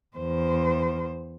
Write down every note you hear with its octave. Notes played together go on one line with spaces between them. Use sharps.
E2 C5